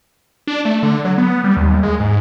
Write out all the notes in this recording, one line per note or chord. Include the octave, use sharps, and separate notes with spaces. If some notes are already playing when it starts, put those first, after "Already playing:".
D4
A3
D3
F#3
B3
G3
D#2
G#3
G#2